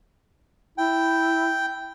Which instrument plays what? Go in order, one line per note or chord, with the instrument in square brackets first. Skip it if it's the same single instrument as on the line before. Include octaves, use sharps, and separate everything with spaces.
[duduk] E4 [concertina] G5